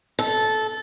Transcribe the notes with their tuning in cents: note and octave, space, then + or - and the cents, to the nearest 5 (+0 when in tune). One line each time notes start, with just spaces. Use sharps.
A4 -15